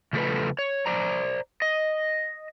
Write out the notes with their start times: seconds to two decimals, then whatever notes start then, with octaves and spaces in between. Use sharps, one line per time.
0.13 C#3 F3 A3 A4 B4
0.59 C#5
0.86 C5 D5 A#5
1.62 D#5